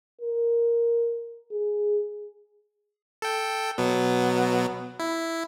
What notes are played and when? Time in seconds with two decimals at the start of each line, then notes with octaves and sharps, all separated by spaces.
0.22 A#4
1.52 G#4
3.22 A4 G5
3.78 B2 F#3 B3
5.00 E4